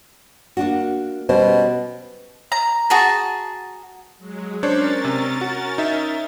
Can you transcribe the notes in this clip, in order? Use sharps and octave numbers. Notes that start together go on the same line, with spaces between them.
A#3 D4 F#4
B2 G3 C#4 C5
A#5
F#4 G#4 A5
F#3 G#3
C#4 D4 A#4 C5 C#5 A6
C3
F#4
D#4 E5